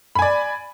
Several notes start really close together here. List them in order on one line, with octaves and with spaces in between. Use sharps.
B5 G#5 D5